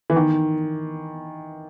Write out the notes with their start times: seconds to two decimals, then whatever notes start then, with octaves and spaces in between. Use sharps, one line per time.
0.10 E3
0.16 D#3